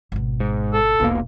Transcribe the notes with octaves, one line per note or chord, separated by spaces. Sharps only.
G#1 B2
G#2
A4
E1 B1 B2 A#3